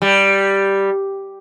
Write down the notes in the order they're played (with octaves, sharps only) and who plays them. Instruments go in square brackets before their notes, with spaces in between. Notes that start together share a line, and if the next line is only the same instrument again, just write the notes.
[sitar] G3